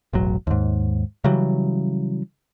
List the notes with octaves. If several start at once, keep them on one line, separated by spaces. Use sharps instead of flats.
E1 A1 F#3
D#2 G#2
C#3 E3 F#3 G3